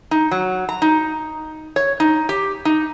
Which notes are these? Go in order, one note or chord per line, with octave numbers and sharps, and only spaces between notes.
D#4
F#3
A#5
D#4
C#5
D#4
G4
D#4